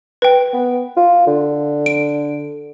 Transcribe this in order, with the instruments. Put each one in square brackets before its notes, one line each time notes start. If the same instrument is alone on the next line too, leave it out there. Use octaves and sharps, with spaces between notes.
[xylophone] B4 G5
[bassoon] B3
F4
D3
[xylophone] D7